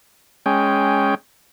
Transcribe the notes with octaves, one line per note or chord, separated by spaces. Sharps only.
G#3 C#4 G5